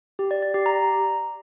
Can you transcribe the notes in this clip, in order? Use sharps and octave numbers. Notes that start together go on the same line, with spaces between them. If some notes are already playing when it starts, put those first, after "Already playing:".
G4
D5
D5
G4
A#5